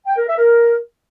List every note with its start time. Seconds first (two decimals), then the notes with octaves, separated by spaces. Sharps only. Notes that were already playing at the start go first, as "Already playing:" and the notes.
0.07 G5
0.17 A#4
0.27 E5
0.38 A#4